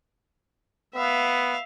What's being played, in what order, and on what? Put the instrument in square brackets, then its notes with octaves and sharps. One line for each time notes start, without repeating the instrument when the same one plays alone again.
[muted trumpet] B3 [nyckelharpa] E5 F5